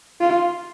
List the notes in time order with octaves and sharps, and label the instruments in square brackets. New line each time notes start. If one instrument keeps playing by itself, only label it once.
[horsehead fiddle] F4